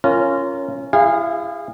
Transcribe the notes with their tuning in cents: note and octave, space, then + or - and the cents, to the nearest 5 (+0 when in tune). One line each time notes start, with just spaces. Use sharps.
C#4 +0 F4 -20 A#4 -10
E4 +30 G#4 -30 F5 +0